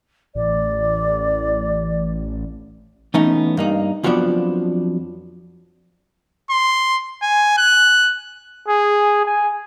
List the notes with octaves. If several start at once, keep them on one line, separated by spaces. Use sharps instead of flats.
A1 D5
E3 A3 B3 C#4 D#4
G2 A#3 D#4
F2 F3 F#3 B3 D4
C6
G#5
F#6
G#4
G#5